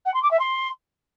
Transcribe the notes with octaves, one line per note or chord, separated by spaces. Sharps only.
F#5
C6
D6
E5
C6